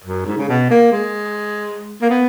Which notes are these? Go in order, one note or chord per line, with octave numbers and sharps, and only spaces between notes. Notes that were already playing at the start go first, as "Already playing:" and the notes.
F#2
G#2
C#3
B2
A#3
G#3
A#3
B3